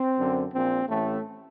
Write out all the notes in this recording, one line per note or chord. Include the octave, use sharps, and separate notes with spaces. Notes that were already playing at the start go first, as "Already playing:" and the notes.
Already playing: C4
F#2 D3
A#1 A#2 C4
A1 A2 A3